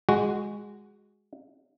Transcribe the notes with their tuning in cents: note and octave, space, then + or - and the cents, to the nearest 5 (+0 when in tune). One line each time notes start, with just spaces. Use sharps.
G#3 -10 F#4 +0